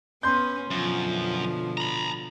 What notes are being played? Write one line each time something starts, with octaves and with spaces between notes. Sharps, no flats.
B3 C#4 B4 C6 G6
F#2 B2 D3 F3
A#5 B5